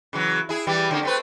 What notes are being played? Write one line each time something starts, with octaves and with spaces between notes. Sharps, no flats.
C#3 E3 F#3
E4 G#4
E3 G3 G4
D3 A#3 C#4
A3 C4 B4